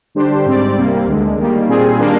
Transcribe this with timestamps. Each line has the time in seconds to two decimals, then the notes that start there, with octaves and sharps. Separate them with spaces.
0.15 D3 G3 D4 G4 C5
0.46 G#2 G3 C4 G4 D5
0.76 C2 C3 G3 A#3
1.07 D2 D3 G#3
1.38 D#3 G3 A#3
1.69 A#2 G3 C4 F4 G#4
1.99 D#3 G3 A#3 D4